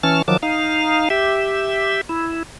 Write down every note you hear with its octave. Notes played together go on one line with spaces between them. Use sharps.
E3 C#4 A5 F6
D#3 F3 F#3 A5 D6
D#4 F5
G4 E5
E4